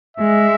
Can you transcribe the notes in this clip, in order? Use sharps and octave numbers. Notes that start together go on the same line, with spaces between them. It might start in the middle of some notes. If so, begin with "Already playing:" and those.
G#3 E5